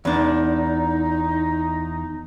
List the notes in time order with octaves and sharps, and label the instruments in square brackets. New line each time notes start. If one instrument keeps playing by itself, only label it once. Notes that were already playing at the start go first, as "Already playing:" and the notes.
[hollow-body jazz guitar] E2 D4 [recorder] D#4